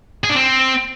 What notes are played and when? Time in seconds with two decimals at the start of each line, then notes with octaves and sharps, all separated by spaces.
0.24 G#4
0.30 D4
0.35 C4